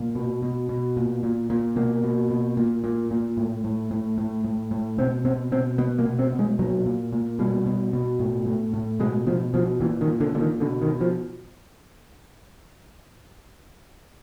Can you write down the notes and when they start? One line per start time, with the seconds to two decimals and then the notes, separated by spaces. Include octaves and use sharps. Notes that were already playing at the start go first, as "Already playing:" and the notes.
Already playing: A#2
0.15 B2
0.43 B2
0.69 B2
0.97 A#2
1.23 A#2
1.50 A#2
1.76 B2 A#3
2.03 B2
2.30 B2
2.57 A#2
2.84 A#2
3.11 A#2
3.37 A2
3.64 A2
3.91 A2
4.18 A2
4.45 A2
4.71 A2
4.98 B2 C4
5.25 B2 C4
5.52 B2 C4
5.78 B2 B3
5.98 A#3
6.06 B2
6.19 C4
6.33 B2
6.39 G#3
6.59 A#2 F#3
6.86 A#2
7.13 A#2
7.39 B2 G3
7.66 B2
7.93 B2
8.19 A2
8.46 A2
8.73 A2
9.00 B2 G#3
9.26 B2 F3
9.54 B2 F3
9.81 A#2 E3
10.01 D#3
10.07 A#2
10.20 D3
10.34 A#2 D3
10.40 D#3
10.60 B2 D3
10.82 D#3
10.87 B2
11.01 F3